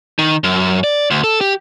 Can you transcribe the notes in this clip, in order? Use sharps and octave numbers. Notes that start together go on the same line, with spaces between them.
D#3
F#2
D5
D2
A4
G4